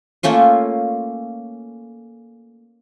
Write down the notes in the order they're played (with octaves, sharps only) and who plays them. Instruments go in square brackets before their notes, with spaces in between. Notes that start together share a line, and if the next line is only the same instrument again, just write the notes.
[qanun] A3 A#3 C#4 F4